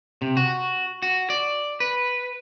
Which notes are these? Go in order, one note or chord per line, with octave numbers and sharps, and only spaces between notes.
C3
F#4
F#4
D5
B4